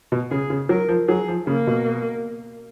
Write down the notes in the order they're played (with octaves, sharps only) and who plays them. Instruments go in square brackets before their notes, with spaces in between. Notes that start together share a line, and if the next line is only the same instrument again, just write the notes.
[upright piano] B2
[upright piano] C#3 [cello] G#4
[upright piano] C#3
[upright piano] F#3 [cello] A#4
[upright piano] F3
[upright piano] F#3 [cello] G#4
[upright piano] F3
[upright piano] C#3 [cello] A#3
[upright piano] B2